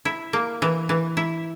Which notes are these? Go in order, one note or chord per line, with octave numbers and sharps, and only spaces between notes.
E4
A#3
E3
E3
E4